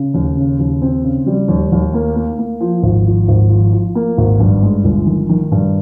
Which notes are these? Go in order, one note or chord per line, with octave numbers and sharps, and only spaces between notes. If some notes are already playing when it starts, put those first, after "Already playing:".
Already playing: C#3
D#2
C#3
D#2
C4
C#3
G3
D#2
D#2
A#3
A#3
A#3
F3
G#1
F3
G#1
F3
F3
A#3
G#1
G2
G#3
G1
D#3
D#3
G2